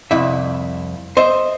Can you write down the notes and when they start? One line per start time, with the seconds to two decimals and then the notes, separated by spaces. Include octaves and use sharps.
0.11 C2 F2 E4 E5
1.17 C5 D#5 E5